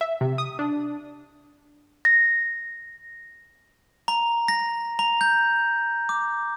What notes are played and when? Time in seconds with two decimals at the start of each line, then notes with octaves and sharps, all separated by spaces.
0.01 E5
0.21 C3
0.38 D#6
0.59 D4
2.05 A#6
4.08 A#5
4.48 A#6
4.99 A#5
5.21 G6
6.09 D6